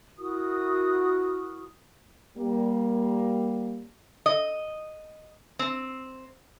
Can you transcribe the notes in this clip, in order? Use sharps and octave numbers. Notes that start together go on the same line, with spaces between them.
E4 F#4 A#4 D#6
G3 A#3
D#5
C4